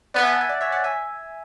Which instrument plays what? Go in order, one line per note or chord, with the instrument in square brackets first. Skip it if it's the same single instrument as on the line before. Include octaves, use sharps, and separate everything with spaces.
[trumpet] B3 [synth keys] D5 F#5
[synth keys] E5 G#5
F#5 A5
E5 G#5
D5
C#5 E5
D5 F#5
E5 G#5